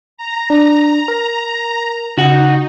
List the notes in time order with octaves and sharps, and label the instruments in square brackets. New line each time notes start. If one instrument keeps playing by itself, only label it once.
[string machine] A#5
[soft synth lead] D4
A#4
[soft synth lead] C#3 [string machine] D#4 [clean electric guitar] F#4 F#5